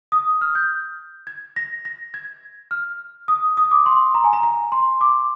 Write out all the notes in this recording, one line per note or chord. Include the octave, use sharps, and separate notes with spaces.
D#6
F6
G6
G#6
A#6
A#6
G#6
F6
D#6
D#6
D6
C6
A#5
G#5
A#5
A#5
C6
D6